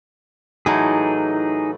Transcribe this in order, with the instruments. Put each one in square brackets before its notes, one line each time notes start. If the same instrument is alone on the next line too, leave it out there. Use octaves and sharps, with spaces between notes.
[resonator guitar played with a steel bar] A2 E3 F#3 [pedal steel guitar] D#4 G#4